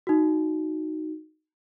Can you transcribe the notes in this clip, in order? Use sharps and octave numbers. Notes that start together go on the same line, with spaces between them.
D#4 F#4